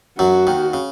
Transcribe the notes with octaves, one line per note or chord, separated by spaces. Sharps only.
F#2 F#3 F#4
D#2 D#3
C#3